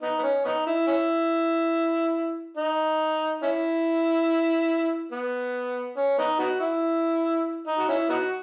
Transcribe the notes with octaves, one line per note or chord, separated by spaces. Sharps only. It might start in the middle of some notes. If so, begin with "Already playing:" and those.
B3 D#4
B3
C#4
B3 D#4
E4
C#4 E4
D#4
C#4 E4
B3
C#4
B3 D#4
B3 D#4 F#4
E4
D#4
F#4
C#4 E4
B3 D#4 F#4